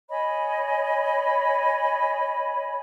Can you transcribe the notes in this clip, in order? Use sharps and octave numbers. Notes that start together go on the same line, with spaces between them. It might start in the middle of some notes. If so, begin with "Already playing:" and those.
C#5 D#5 G#5 B5